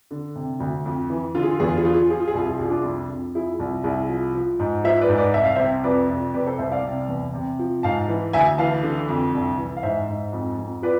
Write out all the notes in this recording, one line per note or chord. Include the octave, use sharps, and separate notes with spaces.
D3
C3
D2
F2
E3
D3 F4
G#4
F4
E2 G#4
F4
G#4
F3 F4
G#4
F4
F3 G#4
F4
G#4
C2 F4
G#4
F4
C2 G#4
D4 F4
F2
F2
F3 E4 G#4
C2
C2 E4 G#4
F3
F3
G#2
F3 C5 E5
B4 D5
G#2
B4 D5
C2 E5
F5
C3 C5 E5
F2 B4 D5
F2
C3 B4 D5
A4 C5
C2 C5 E5
D5 F5
C3
E2
C3
F3
G#2 F5 A5
E3
D2 E5 G#5
E3 F5 A5
D3
F2
C2
E3
F5
G#2 C5 E5
G#2
F2
F2
F3 B4 D5